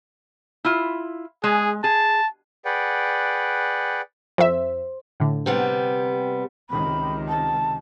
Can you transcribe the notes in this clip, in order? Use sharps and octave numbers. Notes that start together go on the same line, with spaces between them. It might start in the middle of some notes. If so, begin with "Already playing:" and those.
E4 F4
G#3 G#4
G#4 A5
G#4 B4 D5 F#5 G5
F2 C5 E5
A2 D3
C3 G3 B3
C#2 C3 D#3 B5
A5